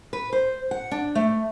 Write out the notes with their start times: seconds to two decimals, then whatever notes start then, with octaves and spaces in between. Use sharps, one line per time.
0.13 B4
0.33 C5
0.71 F#5
0.91 D4
1.15 A3